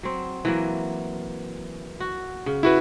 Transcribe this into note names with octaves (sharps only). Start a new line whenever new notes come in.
F#3 C4
E3 F#3 A#3
F#4
C#3
E4 F#4 B4